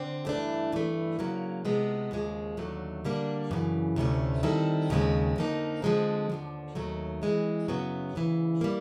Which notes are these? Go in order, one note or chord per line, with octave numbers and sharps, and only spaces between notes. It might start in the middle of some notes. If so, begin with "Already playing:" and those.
Already playing: D3 C4
G2 E3 A3 D4
G2 E3 A3
C#3 F#3 A#3
C3 F3 G#3 B3
D#2 C#3 F3 G#3
D#2 D3 F#3 A3
D3 G3 A#3 D4
F#2 C#3 E3
D2 C3 F3 A3 C#4
D#3 G3 C4 E4 A4
D#2 C#3 F3 G#3 C4
F2 D3 F3 A#3 D#4
D3 F3 G#3 C4
D#2 D3 F3
D#2 D#3 F#3 A3
E3 G#3 C4
F#2 C#3 F#3 B3
D2 C#3 E3
G3 A#3